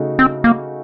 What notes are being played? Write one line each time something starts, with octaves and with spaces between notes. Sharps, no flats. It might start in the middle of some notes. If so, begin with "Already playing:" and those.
Already playing: C#3 A3 D#4 F#4
C4
A#3